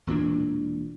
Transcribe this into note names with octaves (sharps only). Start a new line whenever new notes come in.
E1 A#2 E3 D4